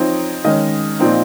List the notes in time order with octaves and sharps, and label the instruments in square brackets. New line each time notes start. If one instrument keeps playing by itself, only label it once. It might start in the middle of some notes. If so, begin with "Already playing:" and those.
Already playing: [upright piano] F3 C4 D#4 C#5
D#3 G#3 C#4 D#5
A#2 F3 C4 D#4